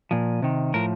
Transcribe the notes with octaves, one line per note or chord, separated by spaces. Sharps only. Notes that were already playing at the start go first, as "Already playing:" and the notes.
A#2 F3
C3 D#3
A2 F3 A#4